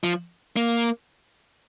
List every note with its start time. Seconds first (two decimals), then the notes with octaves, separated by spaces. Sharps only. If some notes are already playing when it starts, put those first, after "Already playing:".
0.04 F3
0.56 A#3